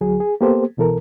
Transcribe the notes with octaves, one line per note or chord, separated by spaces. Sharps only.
D2 F#3 G#4
G#4
A#3 B3 G4 A4 C5
C2 B2 E3 A4 A#4